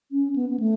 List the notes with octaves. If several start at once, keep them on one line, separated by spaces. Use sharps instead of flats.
C#4
B3
B3
A3